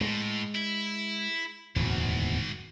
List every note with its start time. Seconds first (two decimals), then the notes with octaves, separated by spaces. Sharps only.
0.01 A2 G#3
0.55 E4
1.76 D1 E2 G#2 B2 D#3